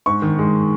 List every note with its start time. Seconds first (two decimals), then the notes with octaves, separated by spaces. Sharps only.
0.06 G#2 C#6
0.22 D#3
0.39 G#3